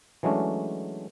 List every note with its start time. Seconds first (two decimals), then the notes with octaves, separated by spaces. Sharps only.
0.23 E3 F#3 G#3 A3 C#4 D4